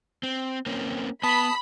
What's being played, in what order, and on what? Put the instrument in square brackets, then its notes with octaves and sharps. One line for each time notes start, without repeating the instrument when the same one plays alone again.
[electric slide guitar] C4
A#3 C4 C#4
[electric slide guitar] B3 [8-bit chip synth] A5 D#6 [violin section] B5